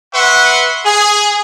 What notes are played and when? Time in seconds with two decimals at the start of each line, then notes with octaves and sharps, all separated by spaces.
0.15 B4 E5 F#5 C6 C#6
0.85 G#4